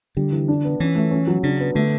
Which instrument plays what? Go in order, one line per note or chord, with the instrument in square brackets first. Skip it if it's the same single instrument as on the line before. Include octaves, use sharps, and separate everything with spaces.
[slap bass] D3 [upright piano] G3
[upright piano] E3
D4
B3
[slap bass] E3 [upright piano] C#4
[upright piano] A3
C#4
F#3
[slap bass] C#3 [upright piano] D4
[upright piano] B3
[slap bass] D3 [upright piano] A3